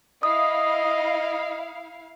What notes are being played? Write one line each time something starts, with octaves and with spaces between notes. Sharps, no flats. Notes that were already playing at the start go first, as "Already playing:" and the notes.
E4 D#5 F5 D#6